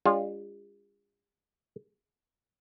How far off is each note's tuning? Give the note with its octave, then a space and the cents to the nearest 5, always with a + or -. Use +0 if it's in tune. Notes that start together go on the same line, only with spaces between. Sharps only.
G#3 -45 D4 -30 F4 +0